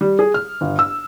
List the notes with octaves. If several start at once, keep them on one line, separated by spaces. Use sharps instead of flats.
G3
G#4
F6
G1
E6